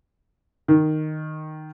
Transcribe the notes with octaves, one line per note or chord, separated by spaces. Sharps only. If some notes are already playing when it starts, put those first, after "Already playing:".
D#3